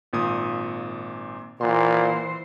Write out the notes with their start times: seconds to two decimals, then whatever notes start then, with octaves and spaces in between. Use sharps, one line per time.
0.13 G#1 A#2 D#6
1.61 A#2 E3 C5 F#5 C6